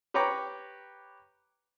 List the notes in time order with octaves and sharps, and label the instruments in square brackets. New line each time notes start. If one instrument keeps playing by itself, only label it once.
[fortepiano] G4 B4 C#5 G5 A#5 D6